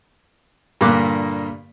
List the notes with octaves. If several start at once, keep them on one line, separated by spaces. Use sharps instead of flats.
G2 A#2 D3 A#3 D6 F#6